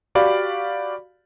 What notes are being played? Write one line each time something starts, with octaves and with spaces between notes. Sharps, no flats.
F#4 G4 D5 F5 B5